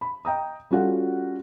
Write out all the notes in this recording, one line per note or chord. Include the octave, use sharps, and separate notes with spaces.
B5
D#5 G5 A#5 D#6
G3 C#4 F4 F#4 A4 F#5